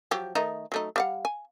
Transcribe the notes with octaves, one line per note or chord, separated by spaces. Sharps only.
F3 F#3 G4
D#3 A3 D#4
F#3 A3 D#4
G3 F5 F#5
G#5